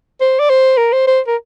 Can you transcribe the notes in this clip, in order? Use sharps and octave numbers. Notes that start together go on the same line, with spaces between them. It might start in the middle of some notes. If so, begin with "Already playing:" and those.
C5
D5
C5
A#4
C5
C5
A#4